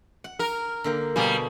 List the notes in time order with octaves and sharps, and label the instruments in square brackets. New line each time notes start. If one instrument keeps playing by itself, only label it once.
[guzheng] F#5
[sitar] A#4
[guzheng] D3 A#3 G5
[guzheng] B2 G#4 [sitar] G3 A#3